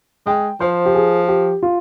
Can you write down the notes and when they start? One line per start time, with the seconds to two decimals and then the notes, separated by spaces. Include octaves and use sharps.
0.26 G#3 G5
0.60 F3 C5
0.86 G4
0.95 G#4
1.29 G4
1.63 F4